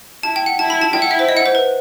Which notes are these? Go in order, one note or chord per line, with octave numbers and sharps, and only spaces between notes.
E4 A5
G5
F#5
E4 A5
B5
A5
E4 G5
F#5
E5
C5
D#5
F#5
C5
B4